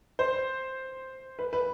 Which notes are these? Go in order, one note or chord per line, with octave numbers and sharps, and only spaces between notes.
C5
B4
B4